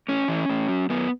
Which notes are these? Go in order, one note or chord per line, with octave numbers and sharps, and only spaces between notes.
A2 C#4
E3
A2
F#3
F#2 B3